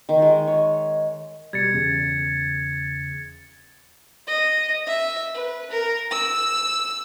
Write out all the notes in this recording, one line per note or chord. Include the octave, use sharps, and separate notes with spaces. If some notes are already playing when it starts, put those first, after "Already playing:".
D#3
G#3
C#5
B2 G3 G#6 A6 C#7
E2 C#3
D#5
E5
B4
A#4
E6